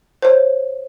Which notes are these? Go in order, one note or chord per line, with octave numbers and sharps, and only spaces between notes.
C5 C#5